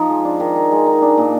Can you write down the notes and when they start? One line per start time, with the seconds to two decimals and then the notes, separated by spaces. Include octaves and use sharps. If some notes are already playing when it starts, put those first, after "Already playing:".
Already playing: F3 D#4 F4
0.10 G#3
0.25 D4
0.40 D#3
0.56 D#3
0.72 G#3
0.86 D#4
1.02 D4
1.18 A#2